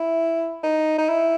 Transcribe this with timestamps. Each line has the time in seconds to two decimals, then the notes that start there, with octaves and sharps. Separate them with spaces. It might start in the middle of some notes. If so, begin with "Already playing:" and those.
Already playing: E4
0.63 D#4
0.99 D#4
1.09 E4